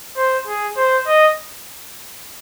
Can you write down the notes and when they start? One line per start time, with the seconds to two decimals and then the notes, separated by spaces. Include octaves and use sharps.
0.17 C5
0.47 G#4
0.77 C5
1.07 D#5